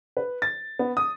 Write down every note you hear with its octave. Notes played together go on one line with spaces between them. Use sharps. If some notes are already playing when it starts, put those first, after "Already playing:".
B4
A6
B3
D#6